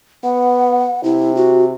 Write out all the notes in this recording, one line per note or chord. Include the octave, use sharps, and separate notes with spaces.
B3 F#5
C3 E4
F#4